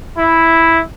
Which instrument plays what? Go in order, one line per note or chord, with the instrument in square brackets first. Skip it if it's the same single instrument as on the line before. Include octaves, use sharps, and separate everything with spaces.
[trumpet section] E4